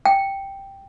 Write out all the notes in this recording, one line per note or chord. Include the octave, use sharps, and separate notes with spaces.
G5